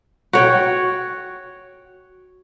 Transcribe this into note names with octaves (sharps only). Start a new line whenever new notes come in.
F#4 C#5 G5